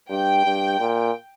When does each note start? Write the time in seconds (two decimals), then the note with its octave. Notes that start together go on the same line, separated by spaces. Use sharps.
0.10 G2 G5
0.45 G2
0.80 A#2